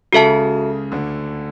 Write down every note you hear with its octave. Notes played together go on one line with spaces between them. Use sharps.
C#2 C#3 F#4 A4 E5 A5
D2 D3